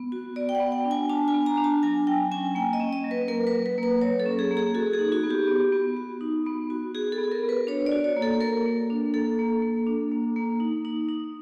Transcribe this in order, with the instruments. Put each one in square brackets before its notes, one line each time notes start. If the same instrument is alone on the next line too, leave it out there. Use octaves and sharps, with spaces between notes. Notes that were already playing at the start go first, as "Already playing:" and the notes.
Already playing: [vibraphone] B3
F#4
B3 D5
G5
F#5
B3
G5
D4
G#5
D4 A5
G#5
B3
A#5
D4
A5
F#3 G#5
F#3 G5
C#4 G#5
A#3 G5
D#5
C#4
D#5
F#3
B4
A#3 A#4
B4
F#3
B4
A#3 B4
F#3 C#5
A4
C#4
G#4
A#3
G#4
F#4 A4
G#4
D#4
F#4
B3
G4
B3
B3
F#4
D#4
B3
F#4
F#4 G#4
A4
B3
A#4
B3
B4
D4 C#5
D5
F#4
C#5
A#3
A4
A#3 A#4
A#3
D4
A#3 A4
A#3
A#3
D4
A#3
A#3
D#4
D#4
D#4